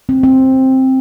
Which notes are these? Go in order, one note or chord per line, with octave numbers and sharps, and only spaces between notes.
C4
C4